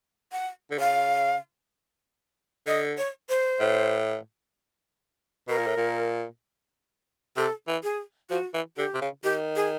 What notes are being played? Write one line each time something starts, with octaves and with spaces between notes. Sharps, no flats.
F#5
D3
C#3 F5
D3 D#5
C#5
C5
A2
B2 A#4
A#2
A2
A#2
C3 A4
E3
G#4
F3 F#4
E3
D3 G4
C3
C#3
D#3 G4
G#4